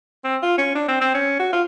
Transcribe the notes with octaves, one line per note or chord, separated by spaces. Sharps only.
C4
F4
C#4
D4
C4
C4
C#4
F#4
F4